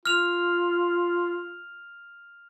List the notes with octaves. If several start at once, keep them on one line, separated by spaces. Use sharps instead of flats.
F4 F6 F7